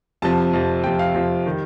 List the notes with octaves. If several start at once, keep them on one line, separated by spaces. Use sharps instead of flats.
F2 C3 F3 A5
F2 C3 F3
F2 C3 F3 G5
F5
F2 C3 F3
D#3 G3